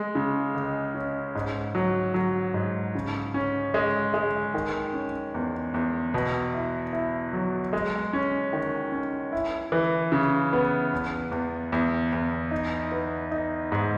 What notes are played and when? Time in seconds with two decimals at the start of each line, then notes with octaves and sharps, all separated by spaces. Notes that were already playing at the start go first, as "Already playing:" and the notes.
Already playing: G#3
0.15 C#3
0.55 C#2
0.94 C#4
1.35 G#2
1.75 F#3
2.14 F#3
2.54 G#2
2.95 C#3
3.34 C#4
3.74 G#3
4.14 G#3
4.54 D#3
4.93 C#4
5.34 E2
5.74 E2
6.14 B2
6.54 E4
6.93 E4
7.33 F#3
7.73 G#3
8.13 C#4
8.53 D#3
8.92 C#4
9.32 E4
9.72 E3
10.12 C#3
10.53 B3
10.93 E2
11.32 E2
11.72 E2
12.13 E2
12.51 D#4
12.92 B3
13.31 D#4
13.72 G#2